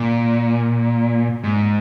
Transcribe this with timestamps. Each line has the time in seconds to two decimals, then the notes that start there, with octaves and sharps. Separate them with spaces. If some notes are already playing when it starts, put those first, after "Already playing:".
Already playing: A#2
1.44 G#2